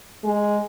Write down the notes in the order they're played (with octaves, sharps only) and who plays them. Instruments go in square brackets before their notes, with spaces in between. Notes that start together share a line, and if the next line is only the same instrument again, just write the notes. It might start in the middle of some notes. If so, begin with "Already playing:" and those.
[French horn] G#3